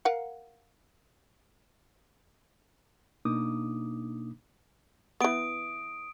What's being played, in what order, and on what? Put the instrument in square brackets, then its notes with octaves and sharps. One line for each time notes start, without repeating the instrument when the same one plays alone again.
[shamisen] A#4 F5 F#5
[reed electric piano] B2 A#3 D4 D#4 D6 D#6
[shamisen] E3 B3 [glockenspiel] D#6 D7